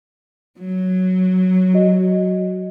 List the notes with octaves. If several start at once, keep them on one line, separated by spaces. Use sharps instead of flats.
F#3
F#4 D#5